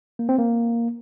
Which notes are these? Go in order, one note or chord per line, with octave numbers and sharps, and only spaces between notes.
A#3
C4
A#3